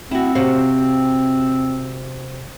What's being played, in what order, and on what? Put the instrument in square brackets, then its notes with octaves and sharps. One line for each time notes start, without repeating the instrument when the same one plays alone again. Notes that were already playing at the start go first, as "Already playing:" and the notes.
[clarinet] C4 [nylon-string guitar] E4 F#4
[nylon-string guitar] C3 F#4 F5